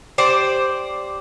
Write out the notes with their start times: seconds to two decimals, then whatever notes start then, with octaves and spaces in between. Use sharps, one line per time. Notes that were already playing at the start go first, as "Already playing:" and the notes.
0.18 G4 C5 D5